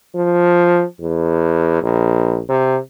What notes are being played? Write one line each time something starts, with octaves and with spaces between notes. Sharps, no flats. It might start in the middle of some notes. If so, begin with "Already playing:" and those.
F3
E2
A#1
C3